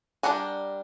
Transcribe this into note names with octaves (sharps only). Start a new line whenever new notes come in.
G3 D4 A#4 F#5 G#5